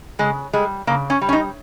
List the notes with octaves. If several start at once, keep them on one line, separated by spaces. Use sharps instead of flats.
C#3 G#3
G3 G#3
C#3 A#3
C#4
G3
C#4
D#4